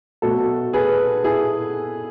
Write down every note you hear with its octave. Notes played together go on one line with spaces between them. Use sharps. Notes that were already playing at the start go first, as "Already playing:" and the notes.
B2 F#3 A3 F#4 A4
G#4 B4
E4 G#4